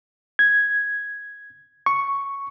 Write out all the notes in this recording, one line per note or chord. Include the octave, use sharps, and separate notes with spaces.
G#6
C#6